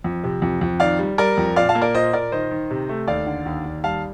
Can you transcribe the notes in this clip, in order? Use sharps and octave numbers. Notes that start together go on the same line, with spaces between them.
F2
C3
F2
F2
D#3 D5 F5
G3
G3 A#4 D5
F2
A#2 D5 F5
F5 A5
A#3
A#4 D5
A#2 C5 D#5
A#2 A#4 D5
D#3 C5 D#5
D#3
C3
A3
D#2 D5 F5
D3
D#2
D#2
G3 F5 A5